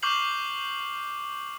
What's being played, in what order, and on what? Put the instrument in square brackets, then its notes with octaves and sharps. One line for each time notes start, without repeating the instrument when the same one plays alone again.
[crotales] C#6 D6 F6 G6 C7 F#7